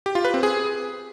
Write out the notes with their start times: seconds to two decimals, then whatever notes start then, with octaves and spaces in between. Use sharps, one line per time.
0.06 G4
0.15 F4
0.25 B4
0.34 C4
0.43 G#4